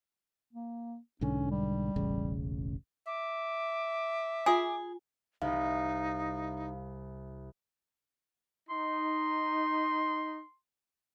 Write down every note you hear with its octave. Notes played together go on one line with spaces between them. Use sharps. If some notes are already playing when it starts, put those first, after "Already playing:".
A#3
B1 G#2 D3 C#4
G3
E1 A1 C#3
E5 D6
F4 G#4 G#5
C2 D#4 F5
D#4 C6